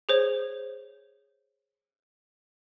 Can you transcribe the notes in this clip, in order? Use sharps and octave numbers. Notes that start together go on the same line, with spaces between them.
G#4 C5 C#5